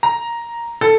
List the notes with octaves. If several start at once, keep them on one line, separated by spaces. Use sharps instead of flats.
A#5
A4